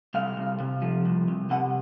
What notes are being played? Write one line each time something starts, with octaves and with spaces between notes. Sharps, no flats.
C2 F5
C2
C3
F3
C2
C2
C3 F#5